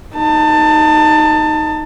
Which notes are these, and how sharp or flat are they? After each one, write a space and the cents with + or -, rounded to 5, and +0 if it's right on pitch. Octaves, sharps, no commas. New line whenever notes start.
D#4 +0 A5 +20